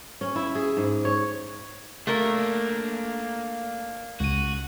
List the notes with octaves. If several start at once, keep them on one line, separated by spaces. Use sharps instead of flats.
C#4
E4
G#4
G#2
C#5
A3 A#3 D4 A#4
C#2 F#4 D#7